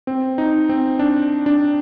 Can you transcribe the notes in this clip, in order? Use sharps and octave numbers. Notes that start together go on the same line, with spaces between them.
C4
D#4
C4
D4
D4